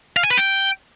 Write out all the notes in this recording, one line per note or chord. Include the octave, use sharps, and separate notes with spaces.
F5
G#5
B4
G5